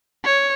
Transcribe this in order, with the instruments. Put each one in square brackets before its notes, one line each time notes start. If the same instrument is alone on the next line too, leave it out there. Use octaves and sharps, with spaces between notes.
[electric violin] C#5